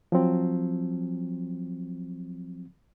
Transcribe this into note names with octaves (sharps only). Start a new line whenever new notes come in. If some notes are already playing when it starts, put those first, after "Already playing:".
F3 F#3 C4